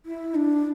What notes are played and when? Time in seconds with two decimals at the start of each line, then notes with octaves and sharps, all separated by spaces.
0.06 E4
0.35 D4